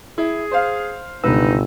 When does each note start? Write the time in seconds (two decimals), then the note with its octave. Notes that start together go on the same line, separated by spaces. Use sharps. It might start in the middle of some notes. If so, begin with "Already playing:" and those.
0.18 E4 G#4
0.51 C5 F5
1.24 G1 C#2 B2 D#4 B4 E6